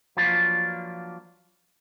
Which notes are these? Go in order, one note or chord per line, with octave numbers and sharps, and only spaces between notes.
F3 F#3 A#3 D4 F4 B4